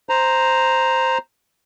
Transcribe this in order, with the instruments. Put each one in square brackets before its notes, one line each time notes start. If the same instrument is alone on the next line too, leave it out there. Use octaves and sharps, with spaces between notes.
[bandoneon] C5 A#5